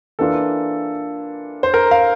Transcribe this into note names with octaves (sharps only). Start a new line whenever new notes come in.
E3 A#3 D4 F4 A4
C5
A#4
F5